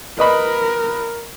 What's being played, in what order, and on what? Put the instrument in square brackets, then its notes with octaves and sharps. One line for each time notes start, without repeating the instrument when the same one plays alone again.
[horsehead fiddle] A#4 [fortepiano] B4 D#5 B5